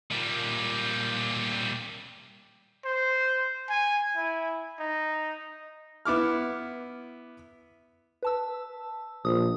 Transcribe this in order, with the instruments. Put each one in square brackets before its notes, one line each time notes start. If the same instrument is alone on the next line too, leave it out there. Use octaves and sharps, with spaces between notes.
[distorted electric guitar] A#2 G3
[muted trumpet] C5
G#5
E4
D#4
[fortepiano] B3 E4 D6 F6
[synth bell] B4 A5 E6
[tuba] A#1 [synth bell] D#6